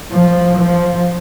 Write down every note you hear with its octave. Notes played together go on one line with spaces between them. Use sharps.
F3
F3